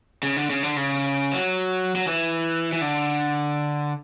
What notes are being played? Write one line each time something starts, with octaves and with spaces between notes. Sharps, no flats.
C#3
D3
C#3
D3
C#3
F#3
F#3
E3
E3
D3